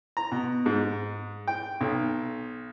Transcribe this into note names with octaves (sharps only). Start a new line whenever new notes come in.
A#5
B2
G#2
G5
B1